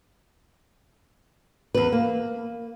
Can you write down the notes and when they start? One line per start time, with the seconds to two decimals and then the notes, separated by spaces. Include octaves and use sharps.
1.75 E2 B4
1.92 A#3